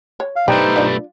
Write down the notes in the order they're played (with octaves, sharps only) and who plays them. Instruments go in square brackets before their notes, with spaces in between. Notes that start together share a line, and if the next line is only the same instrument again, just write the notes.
[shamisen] C#5
[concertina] F5
[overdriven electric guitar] B1 A3 [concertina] D#4 C5 [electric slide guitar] G4 B4 [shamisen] D5 G5
[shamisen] D4 E4 F4